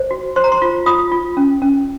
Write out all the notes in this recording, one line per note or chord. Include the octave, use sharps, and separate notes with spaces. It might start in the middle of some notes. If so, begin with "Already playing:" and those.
Already playing: C5
F#4
C5 C6
A#5
C6
F4
F4 D#6
F4
C#4
C#4